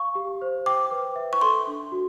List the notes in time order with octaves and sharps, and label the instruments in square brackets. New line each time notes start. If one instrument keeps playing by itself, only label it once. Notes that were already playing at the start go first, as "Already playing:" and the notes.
Already playing: [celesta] F5 [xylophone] C#6
[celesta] G4
C5
[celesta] G5 [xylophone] D6
[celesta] B4
E5
[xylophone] C#6
[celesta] A4 [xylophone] C6
[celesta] D4
F#4